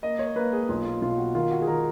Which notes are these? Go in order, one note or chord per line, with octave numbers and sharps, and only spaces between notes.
A#3 D#5
C#5
A#3 B4
G#4
B1 F4
F4
B2 F4
F#4
D#3 F4
F#4
G#4
D#3 A#4